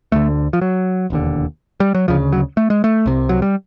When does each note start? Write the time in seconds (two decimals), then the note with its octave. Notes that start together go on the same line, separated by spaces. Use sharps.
0.12 D2 D3 A3
0.53 F3
0.61 F#3
1.10 E1 D#2 D3
1.80 G3
1.95 F#3
2.08 D2 C#3 F3
2.33 F#3
2.57 A3
2.70 G#3
2.84 A3
3.06 C2 C3
3.29 F#3
3.42 G3